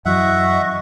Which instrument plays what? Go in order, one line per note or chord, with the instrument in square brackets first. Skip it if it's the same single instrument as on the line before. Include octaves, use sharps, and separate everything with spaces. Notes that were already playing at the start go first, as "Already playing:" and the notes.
[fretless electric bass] F#2 E3 F#3 [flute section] D#5 C#6 [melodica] E5 F#5